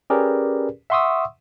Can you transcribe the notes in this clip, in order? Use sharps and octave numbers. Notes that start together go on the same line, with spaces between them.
C#4 G4 G#4 A#4 B4 D5
E5 F#5 C6 C#6 D#6 E6